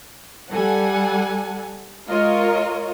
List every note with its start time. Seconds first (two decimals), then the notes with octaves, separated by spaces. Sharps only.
0.50 G3 A4 F#5 G#5
2.08 G#3 F4 A#4 C#5 D#5